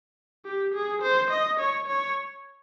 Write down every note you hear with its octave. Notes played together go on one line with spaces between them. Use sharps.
G4
G#4
C5
D#5
C#5
C#5